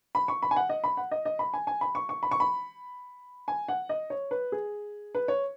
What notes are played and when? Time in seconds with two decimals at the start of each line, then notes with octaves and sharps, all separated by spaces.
0.15 B5
0.28 C#6
0.42 B5
0.51 G#5
0.56 F#5
0.69 D#5
0.84 B5
0.97 F#5
1.11 D#5
1.25 D#5
1.39 B5
1.53 G#5
1.67 G#5
1.81 B5
1.95 C#6
2.09 C#6
2.23 B5
2.31 C#6
2.40 B5
3.48 G#5
3.68 F#5
3.89 D#5
4.10 C#5
4.31 B4
4.52 G#4
5.15 B4
5.28 C#5